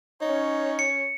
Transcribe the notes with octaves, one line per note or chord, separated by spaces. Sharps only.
C#4 D#4 C#5
C#7